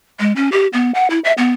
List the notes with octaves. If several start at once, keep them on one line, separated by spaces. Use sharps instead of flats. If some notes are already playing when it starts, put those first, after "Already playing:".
G#3
C#4
G4
B3
F#5
E4
E5
B3